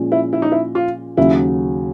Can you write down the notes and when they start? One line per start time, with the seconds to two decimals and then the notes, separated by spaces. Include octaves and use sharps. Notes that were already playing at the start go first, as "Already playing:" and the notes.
Already playing: A#2 F3 G#3 C#4
0.12 E4
0.33 E4
0.42 D#4
0.52 E4
0.75 F4
1.17 D#2 C#3 F#3 E4